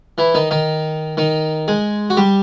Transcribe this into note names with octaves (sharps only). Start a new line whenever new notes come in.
E3 E4
D#3 D#4
D#3 D#4
D#3 D#4
G#3 G#4
F#4
G3 G4